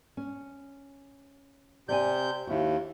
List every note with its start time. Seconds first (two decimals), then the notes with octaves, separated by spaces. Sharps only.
0.17 C#4
1.89 C3 D5 G#5 G6
2.47 D#2 E4 F#4